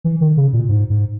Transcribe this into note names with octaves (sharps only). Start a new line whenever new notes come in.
E3
D#3
C#3
A#2
G#2
G#2